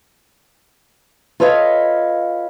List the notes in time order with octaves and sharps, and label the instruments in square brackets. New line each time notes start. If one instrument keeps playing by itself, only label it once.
[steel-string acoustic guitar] F4 A4 B4 C#5 D#5 F5